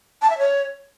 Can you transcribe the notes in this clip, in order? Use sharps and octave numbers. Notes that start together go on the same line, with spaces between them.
A5
E5
C#5